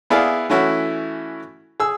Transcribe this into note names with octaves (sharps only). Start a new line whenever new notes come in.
B3 E4 G#4 D5 F5
E3 A3 C#4 E4 F#4
G#4 E6